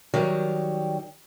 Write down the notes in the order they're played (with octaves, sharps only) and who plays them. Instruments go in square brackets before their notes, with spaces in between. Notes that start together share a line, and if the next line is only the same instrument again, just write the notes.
[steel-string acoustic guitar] D#3 F#3 G3